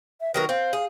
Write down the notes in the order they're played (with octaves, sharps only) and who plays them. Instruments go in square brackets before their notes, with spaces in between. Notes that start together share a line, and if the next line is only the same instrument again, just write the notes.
[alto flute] E5
[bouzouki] D#3 F#3 A#4 [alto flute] B4
[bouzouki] C4 [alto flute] F5
[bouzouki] G#4